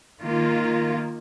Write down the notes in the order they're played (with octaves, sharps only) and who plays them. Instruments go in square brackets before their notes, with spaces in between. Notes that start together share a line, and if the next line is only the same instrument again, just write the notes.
[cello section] D#3 A#3 F4